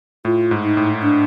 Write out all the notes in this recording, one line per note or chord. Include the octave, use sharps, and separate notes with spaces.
A2 F4
G#2
D#4
A2
D4